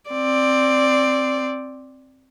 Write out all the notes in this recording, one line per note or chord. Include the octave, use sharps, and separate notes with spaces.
C4 D5